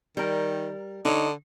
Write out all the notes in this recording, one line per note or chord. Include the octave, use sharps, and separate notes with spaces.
D#3 G3 A#4
D3 D#4 C#5